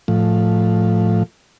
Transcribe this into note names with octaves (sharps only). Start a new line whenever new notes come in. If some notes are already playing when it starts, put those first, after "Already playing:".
A2 F3